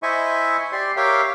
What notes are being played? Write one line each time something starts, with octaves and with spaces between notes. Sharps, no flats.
E4 C5 D#5 E5 G#5 C#6
G4 D5 C6
G4 A#4 C#5 E5 F5 G5